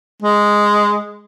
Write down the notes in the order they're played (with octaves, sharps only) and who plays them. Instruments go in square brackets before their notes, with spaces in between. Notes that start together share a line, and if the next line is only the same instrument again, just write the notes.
[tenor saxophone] G#3